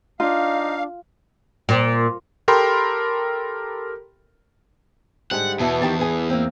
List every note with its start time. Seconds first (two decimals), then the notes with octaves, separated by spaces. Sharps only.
0.20 D4 D#4 F4 F5
1.69 A#2
2.48 G4 A4 A#4 G5 B5 C6
5.31 G#2 D3 G3 F#5
5.59 E2 B2 E3 A5
5.82 D#3 G4 A5
5.99 E3 G#4 B4
6.30 A#3 C4